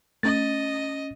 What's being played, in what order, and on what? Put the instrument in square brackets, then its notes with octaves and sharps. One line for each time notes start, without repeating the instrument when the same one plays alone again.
[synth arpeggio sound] A3 [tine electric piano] C#4 A6 [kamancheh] D#5